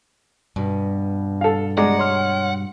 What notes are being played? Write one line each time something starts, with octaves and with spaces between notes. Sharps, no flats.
G2 B2
A4 F5
G#3 D5 F#5 A#5 D6
C#5 C6 F6